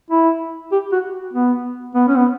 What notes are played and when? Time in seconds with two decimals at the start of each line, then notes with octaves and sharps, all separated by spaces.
0.11 E4
0.72 G4
0.92 F#4
1.33 B3
1.95 B3
2.08 C#4
2.17 B3